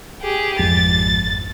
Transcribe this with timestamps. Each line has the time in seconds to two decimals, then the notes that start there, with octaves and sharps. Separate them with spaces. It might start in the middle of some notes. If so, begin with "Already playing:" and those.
0.22 G4 G#4
0.59 G#1 F2 A6